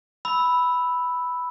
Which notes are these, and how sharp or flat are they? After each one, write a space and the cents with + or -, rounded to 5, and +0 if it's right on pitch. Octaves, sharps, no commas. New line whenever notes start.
B5 +0 E6 -10